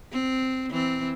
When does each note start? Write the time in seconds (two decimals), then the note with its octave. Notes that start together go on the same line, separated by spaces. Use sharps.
0.12 C4
0.70 E3 C4